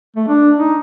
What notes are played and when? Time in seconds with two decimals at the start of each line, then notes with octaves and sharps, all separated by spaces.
0.16 A3
0.28 D4
0.58 D#4